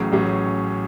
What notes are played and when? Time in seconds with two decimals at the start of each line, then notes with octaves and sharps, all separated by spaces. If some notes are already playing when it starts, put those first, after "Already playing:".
Already playing: A1 A2 F#3 C#4 G#4
0.12 A1 A2 F#3 C#4 G#4